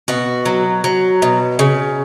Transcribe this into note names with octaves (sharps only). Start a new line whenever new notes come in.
B2 F#4
F#3
F#3
B2
C#3